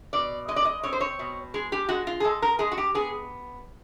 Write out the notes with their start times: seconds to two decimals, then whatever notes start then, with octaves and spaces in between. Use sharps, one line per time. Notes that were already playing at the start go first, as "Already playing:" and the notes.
0.13 B2 D5
0.48 G#3 D#5
0.56 D5
0.65 D#5
0.83 C4 C#5
0.93 C5
1.00 C#5
1.19 B2
1.54 G#3 G#4
1.72 G4
1.89 G#3 F#4
2.07 F4
2.20 G#4
2.24 G#3 A4
2.42 A#4
2.59 G#3 G#4
2.72 F#4
2.78 G4
2.95 B3 G#4